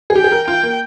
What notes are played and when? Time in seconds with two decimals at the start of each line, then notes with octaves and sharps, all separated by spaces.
0.10 G#4
0.15 G4 G5
0.24 G#4
0.32 A#4
0.47 F4 G5
0.63 A#3